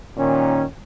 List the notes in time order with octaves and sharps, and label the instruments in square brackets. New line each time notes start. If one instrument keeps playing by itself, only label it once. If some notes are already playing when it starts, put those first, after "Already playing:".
[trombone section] A#2 D#3 C#4